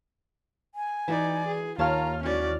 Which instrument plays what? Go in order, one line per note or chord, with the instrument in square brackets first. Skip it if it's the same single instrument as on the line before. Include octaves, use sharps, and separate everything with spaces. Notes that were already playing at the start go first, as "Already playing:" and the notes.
[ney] G#5
[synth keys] E3 [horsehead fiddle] D#4 D5 [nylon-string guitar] E4 F#4 B4
[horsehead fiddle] G#4
[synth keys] D#2 C#5 F6 [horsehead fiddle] F4 [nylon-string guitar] A#4 F5 A5 [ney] A#5
[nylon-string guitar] E3 G#3 [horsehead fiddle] C#4 D5 [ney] F#4